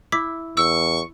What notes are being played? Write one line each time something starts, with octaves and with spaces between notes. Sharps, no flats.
E4 D6 B6
E2 C#6 E6